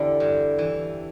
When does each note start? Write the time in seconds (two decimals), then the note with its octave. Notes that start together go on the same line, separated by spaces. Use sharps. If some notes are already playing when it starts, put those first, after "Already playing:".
Already playing: E2 D3 E4 G4 A4
0.20 G2
0.58 E3